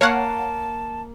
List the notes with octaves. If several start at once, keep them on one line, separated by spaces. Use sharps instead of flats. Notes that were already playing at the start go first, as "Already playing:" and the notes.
A#3 C#5 F5 F#5 A5